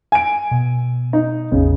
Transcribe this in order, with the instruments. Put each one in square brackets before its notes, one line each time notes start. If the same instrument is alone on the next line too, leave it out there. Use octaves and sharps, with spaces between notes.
[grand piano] G#5 D7
[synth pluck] B2
[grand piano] D#4
[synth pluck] A1 E2 [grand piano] C#3